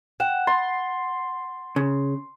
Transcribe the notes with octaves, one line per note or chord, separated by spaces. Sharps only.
F#5 G5 F#6 E7
C6 A6
C#3